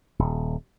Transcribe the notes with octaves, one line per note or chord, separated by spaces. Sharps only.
D#1